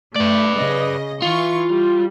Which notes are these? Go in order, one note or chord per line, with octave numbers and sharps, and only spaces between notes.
A3 B4 D5
C#3 D#5
E3 F4 C#6
G3